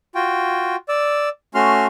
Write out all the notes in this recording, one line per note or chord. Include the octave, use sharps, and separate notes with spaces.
F4 F#4 G5
D5 E6
A3 C#4 F#4 C6 F6